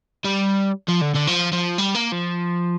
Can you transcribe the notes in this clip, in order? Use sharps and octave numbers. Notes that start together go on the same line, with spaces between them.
G3
F3
D3
D3
F3
F3
G3
A#3
F3